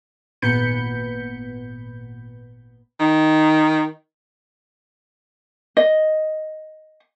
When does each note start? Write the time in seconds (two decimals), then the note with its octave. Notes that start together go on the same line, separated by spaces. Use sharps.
0.42 G#1 A#2 B3 B5 G6 C#7
3.00 D#3
5.77 D#5